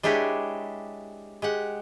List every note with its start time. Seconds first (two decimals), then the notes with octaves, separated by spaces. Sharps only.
0.03 G#3 D4 E4 G4 B4 C#5
1.42 G#3 G4 F#5